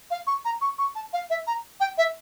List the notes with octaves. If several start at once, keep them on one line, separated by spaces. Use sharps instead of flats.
F5
C#6
A#5
C#6
C#6
A5
F5
E5
A#5
G5
E5